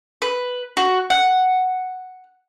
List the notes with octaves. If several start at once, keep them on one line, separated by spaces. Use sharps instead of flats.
B4
F#4
F#5